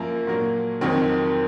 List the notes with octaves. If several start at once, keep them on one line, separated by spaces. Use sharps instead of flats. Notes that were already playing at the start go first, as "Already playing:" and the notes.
Already playing: F#2 F3 A#3 A#4
A#2 F#3 A#3 A#4
F2 D#3 F#3 C4